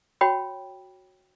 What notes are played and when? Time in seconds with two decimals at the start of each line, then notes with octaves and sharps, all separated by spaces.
0.21 F#4 C#5 G5 B5